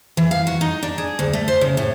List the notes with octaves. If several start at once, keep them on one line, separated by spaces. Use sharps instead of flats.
E3
F5
F#4
D#4
D4
G#4
D2
A3
C5
C#3
A2